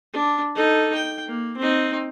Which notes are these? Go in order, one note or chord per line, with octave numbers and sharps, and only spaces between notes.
D4
D#4 A4
G5
A#3
C4 D#4